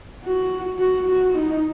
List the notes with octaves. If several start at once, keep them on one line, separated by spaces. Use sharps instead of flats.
F#4
F#4
F#4
D#4